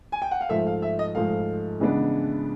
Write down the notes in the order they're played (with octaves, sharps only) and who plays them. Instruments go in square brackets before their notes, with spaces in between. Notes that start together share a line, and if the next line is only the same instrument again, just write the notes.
[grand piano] G#5
G5
F#5
F5
[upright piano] G#2 F3 A3 [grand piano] E5
[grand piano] F5
E5
D#5
[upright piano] G#2 F3 A3 [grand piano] F5
[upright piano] C#3 E3 G#3 B3 D4